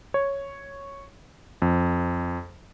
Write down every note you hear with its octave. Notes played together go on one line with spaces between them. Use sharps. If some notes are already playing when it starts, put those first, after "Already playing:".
C#5
F2